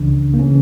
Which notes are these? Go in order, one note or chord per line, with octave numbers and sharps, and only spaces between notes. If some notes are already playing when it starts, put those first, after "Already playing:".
Already playing: C#2 C#3 E3 D4
A#3
C#3 E3 C#4